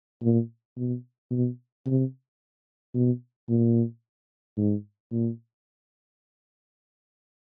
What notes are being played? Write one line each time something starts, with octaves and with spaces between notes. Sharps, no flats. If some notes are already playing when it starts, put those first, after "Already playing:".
A#2
B2
B2
C3
B2
A#2
G#2
A#2